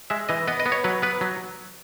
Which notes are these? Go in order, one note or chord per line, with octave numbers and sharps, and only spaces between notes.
G#3 E5
E3 D#5
B3 D#5
D#5
B3
C#5
F#3 B4
B3 B4
F#3